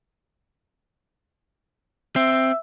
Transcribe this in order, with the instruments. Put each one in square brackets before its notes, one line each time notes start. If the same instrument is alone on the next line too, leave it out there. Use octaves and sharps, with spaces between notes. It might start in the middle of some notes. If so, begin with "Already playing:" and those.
[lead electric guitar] C4 [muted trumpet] E5